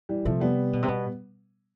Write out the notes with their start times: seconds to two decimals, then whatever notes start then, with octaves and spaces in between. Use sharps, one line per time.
0.09 E3 G3
0.25 C3 F3 A3
0.40 G3 B3
0.73 B2
0.82 C3
0.88 B2